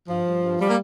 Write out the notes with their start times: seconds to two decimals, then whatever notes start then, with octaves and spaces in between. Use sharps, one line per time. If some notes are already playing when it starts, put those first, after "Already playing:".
0.08 G2 F3
0.26 G2
0.42 G2
0.59 F3 G3
0.68 A#3